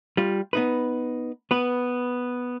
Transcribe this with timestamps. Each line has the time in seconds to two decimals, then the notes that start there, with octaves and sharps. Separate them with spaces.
0.17 G3 F4
0.53 B3 D#4 B4
1.51 B3 B4